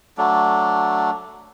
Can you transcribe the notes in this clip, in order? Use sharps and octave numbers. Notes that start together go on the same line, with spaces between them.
F#3 A3 D4